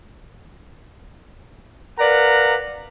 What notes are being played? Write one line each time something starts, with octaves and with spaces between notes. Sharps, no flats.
A#4 B4 D5 F5 F#5 A#5